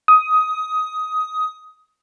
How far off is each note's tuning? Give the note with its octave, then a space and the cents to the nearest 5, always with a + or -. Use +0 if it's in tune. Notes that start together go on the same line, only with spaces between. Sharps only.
D#6 +15